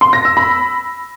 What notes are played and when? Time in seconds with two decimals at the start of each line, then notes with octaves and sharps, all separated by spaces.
0.01 C6
0.13 A#6
0.25 E6
0.37 B5